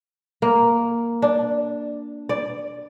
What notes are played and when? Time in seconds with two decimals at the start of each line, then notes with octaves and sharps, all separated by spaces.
0.42 A#3
1.22 D4
2.29 D5